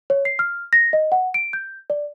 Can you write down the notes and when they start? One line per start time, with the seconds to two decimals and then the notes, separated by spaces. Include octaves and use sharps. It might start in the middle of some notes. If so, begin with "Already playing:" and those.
0.10 C#5
0.25 C7
0.39 F6
0.73 A#6
0.93 D#5
1.12 F#5
1.34 D7
1.53 G6
1.90 D5